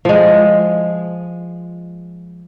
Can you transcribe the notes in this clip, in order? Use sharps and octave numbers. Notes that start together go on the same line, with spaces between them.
F3 G#3